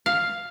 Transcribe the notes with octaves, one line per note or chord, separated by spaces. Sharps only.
F5